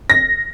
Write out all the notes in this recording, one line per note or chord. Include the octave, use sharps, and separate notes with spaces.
A#6